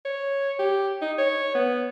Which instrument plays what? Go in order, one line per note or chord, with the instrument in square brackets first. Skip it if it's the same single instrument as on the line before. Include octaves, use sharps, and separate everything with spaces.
[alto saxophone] C#5
G4
D#4
C#5
B3